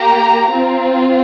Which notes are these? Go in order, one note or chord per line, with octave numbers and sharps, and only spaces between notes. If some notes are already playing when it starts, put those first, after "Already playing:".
Already playing: A#3 G4 A#5
C4 F4